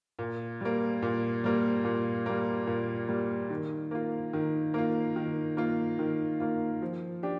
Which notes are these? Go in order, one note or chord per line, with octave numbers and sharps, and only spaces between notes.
A#2
G3 A#3
A#2
G3 A#3
A#2
G3 A#3
A#2
G3 A#3
D#3
A#3 F4
D#3
A#3 F4
D#3
A#3 F4
D#3
A#3 F4
F3
D4 G4